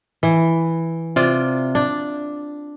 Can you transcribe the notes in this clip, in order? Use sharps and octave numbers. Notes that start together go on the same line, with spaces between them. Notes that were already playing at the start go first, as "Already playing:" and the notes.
E3
C3 F4 D5
D4